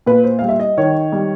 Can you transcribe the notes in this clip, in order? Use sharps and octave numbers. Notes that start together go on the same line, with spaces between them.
A#2 B4
C5
G3 F5
E5
D#5
D#3 C#5
G3